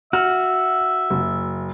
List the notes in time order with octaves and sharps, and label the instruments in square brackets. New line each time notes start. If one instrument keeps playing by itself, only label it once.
[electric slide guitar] F#4 [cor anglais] E5 [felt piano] F6
[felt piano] F#1